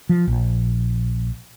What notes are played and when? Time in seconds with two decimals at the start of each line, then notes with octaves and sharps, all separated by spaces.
0.09 F3
0.28 A#1